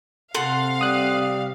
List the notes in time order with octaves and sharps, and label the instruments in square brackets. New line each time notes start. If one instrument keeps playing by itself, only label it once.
[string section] C3 F5 [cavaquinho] A4 F#5 C6
[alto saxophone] G3 [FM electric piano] D#6 F#6